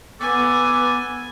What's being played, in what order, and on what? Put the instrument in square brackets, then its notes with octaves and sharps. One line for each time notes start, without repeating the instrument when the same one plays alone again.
[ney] B3 [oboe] A4 [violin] G#5 [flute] D6